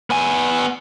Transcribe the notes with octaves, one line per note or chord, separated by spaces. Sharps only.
B3 G#5